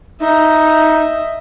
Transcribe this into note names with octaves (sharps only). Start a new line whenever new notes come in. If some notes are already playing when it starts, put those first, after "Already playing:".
D#4 D#5 E5